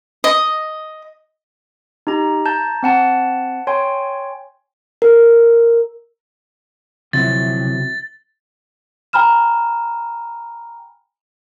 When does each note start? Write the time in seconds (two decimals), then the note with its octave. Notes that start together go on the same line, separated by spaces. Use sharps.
0.24 D#5
2.07 D#4 G4 A#5
2.45 A5 A#5 G6
2.83 C4 F#5 A5
3.67 C#5 G5 G#5 C6
5.02 A#4
7.13 D2 C3 F3 F#3 E4 A6
9.13 G5 G#5 A#5 B5 F6 E7